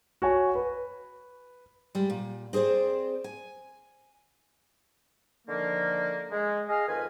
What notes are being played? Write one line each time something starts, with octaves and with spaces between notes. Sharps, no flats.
F#4 C#5 G#5
B4
G3 G#3
A#2
C4 G#4 B4 C5 D5
G#5
D3 D#3 F3 A#3
G#3
G#4 D#5 F5
F2 D#3 B4 F5 G#5